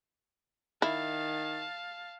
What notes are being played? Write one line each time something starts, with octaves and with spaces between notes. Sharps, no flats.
D#3 E4 F5 A5